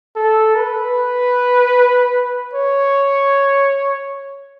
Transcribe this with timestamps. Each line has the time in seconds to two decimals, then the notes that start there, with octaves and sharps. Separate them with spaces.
0.16 A4
0.55 B4
2.54 C#5